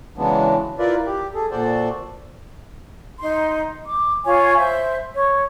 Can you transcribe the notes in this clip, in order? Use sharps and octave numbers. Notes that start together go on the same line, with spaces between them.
C#3 E3 F#3 G#3 B3 D4
E4 F4 A#4 B4 D5
G4
G#4 A4
A#2 F#4 A4 C5 D5
D#4 C6
D6
F4 C#5 G#5
C5 E5
C#5